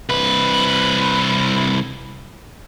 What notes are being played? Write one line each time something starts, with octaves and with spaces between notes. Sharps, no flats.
C2 B4